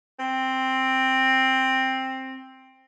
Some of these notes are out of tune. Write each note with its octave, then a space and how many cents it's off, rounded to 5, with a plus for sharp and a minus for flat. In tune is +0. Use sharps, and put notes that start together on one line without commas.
C4 +5